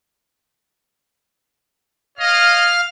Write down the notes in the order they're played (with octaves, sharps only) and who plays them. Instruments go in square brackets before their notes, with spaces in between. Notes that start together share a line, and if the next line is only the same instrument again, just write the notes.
[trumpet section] C#5 D#5 [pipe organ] F5 F6